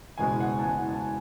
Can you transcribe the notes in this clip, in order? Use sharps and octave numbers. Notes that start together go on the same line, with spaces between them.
F#1 E2 B2 G#3 G#5
F#5
A5
F#1 E2 B2 G#3 G#5
F#5
A5